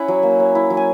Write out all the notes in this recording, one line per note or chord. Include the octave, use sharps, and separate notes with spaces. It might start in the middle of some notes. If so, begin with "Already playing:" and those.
Already playing: C#4 E4 F#5 G#5
F#3
A#3
C#4
E4
F#3
G#5